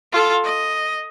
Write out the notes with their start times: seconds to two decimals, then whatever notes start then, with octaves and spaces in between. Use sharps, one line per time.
0.12 F4 A4
0.44 D#5